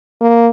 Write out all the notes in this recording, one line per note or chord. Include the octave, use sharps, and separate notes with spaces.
A#3